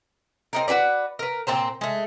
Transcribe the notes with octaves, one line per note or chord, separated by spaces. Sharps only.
C4 D#4 A#4
F#4 G4 B4 D5
A#4 B4
A#2 C4 C5 A#5
G#3 A3